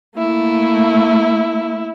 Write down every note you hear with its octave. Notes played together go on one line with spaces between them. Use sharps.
A3 A#3 E4